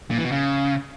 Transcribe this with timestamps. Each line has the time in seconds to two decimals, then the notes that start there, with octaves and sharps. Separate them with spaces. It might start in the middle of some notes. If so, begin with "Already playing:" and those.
0.11 A#2
0.18 E3
0.25 B2
0.32 C#3